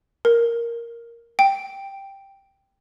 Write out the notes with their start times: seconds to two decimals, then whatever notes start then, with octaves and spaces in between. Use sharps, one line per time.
0.25 A#4
1.39 G5